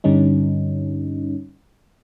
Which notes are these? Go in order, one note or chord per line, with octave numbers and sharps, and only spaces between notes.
G2 D3 G3 C#4 D#4